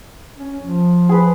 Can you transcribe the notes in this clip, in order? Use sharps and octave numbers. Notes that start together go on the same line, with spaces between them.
C#4
F3
G#4 B4